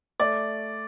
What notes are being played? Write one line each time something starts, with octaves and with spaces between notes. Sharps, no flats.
A3 D5